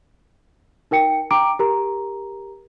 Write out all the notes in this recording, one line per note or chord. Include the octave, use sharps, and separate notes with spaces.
D#4 A#4 G5 C#7
G5 A#5 D6 D7
G4 A#4 A#5